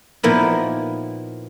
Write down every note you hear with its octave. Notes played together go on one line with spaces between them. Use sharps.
A#2 F3 A#3 B3 D#4 E4